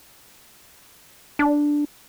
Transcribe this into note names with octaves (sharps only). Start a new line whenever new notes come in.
D4